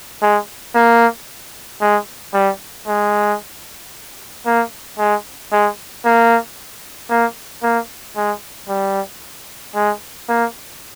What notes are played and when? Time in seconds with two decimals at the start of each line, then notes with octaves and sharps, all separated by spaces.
0.22 G#3
0.75 A#3
1.81 G#3
2.34 G3
2.87 G#3
4.46 A#3
4.98 G#3
5.52 G#3
6.05 A#3
7.10 A#3
7.63 A#3
8.16 G#3
8.69 G3
9.75 G#3
10.29 A#3